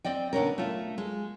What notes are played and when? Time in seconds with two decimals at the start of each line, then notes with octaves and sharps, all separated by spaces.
0.05 C4 D5 D#5 G5
0.33 B2 D3 C#4 A#4
0.58 A3 F4
0.98 G#3